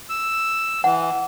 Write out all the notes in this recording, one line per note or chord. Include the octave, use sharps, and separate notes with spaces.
E6
E3 F#5